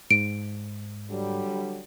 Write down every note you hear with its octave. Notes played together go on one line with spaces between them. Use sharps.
G#2 D7
D3 F#3 G3